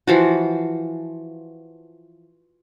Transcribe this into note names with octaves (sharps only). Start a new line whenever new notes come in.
E3 F3 F#4